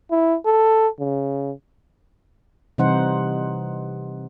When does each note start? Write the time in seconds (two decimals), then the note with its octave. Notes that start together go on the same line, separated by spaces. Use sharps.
0.11 E4
0.46 A4
1.00 C#3
2.78 C3 E3 G3 D#4 C5 F#5